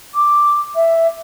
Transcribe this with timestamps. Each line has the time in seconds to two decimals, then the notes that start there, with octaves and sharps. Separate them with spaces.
0.14 D6
0.75 E5